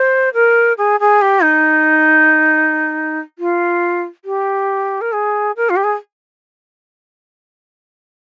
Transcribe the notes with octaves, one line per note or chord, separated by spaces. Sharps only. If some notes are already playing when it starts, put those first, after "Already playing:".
Already playing: C5
A#4
G#4
G#4
G4
D#4
F4
G4
A#4
G#4
A#4
F4
G4
G#4